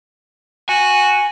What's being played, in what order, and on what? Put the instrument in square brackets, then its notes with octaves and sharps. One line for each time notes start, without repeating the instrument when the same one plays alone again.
[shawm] F#4 [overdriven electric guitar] G#5